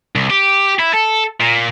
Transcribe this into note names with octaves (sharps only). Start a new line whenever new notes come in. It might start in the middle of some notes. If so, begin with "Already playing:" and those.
C2
G4
E4
A4
A#2